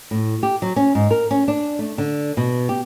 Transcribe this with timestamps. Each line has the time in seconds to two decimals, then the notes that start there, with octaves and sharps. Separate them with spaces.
0.11 A2
0.43 G4
0.62 F#3
0.76 C#4
0.95 G#2
1.11 A#4
1.31 C#4
1.48 D4
1.79 A3
1.98 D3
2.37 B2
2.69 G4